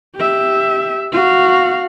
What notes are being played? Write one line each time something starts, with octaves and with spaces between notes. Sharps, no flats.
G4 E5
F#4 F5